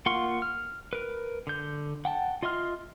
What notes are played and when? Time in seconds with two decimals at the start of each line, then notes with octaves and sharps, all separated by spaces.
0.06 A#3 F4 F#5 C6 C#6
0.42 F6
0.93 A#4 B4
1.47 D3 G6
2.05 F#5 G5 A5
2.43 F4 D#5 E5 C6 F6